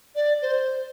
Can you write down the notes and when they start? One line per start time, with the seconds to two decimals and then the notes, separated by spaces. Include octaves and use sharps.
0.15 D5
0.42 C5